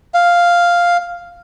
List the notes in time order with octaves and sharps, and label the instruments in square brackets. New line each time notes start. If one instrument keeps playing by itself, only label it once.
[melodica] F5